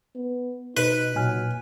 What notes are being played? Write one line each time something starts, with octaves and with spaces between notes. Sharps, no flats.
B3
B2 D#4 B4
A#2 F#3 G#5 F6